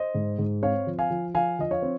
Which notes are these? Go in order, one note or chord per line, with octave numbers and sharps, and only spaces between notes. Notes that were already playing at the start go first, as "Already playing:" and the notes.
Already playing: C5 D#5
G#2
G#2
C4 C#5 F5
F3
F5 G#5
F3
F3 F5 G#5
F3 D#5
C#5 F5
C4